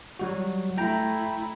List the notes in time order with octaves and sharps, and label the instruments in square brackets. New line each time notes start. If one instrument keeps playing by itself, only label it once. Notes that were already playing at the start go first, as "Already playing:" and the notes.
[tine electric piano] F#3 G3 F#4
[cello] A3 E4 [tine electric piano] G5 A#5